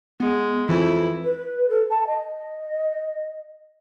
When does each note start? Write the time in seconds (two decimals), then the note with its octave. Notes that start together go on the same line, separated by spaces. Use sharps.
0.20 G#3 B3
0.69 F2 E3 E4
1.23 B4
1.69 A4
1.90 A5
2.07 D#5